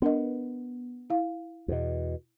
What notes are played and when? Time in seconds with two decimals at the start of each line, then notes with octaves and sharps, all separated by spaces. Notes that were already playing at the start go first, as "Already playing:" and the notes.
0.02 B3 D4 A#4 D#5
1.10 E4 F5
1.68 E2 B2